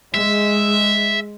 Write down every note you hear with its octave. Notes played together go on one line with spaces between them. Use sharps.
G#3 E5